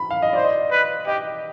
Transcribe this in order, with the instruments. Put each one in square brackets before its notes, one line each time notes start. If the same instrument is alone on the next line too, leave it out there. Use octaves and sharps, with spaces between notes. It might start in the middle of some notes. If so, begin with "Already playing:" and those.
Already playing: [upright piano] B5
F5
D#5
[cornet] C5 [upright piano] D5
[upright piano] D#5
[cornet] B4
[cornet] G4 [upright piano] D#5